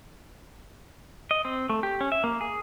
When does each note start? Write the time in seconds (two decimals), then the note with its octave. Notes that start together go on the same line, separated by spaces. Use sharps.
1.31 D#5
1.45 C4
1.69 A3
1.83 G4
2.01 C#4
2.12 E5
2.24 A#3
2.41 G#4